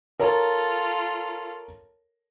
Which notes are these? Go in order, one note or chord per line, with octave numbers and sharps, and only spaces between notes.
F4 A4 A#4 C#5 A#5